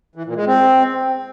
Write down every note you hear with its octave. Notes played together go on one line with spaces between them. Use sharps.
E3
A#2
G#3
C4